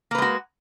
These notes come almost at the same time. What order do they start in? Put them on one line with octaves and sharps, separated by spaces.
A#3 B4 G#3 F#4